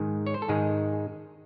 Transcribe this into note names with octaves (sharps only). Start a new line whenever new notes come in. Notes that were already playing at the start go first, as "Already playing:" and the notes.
Already playing: G#2 D#3 G#3
C#5
C5
A4
G#2 D#3 G#3 G#4